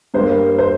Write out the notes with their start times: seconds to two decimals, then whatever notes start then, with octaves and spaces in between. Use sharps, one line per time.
0.14 G2 G3 A#3 C5
0.58 C5